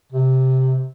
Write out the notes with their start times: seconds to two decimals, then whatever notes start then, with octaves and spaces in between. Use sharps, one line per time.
0.12 C3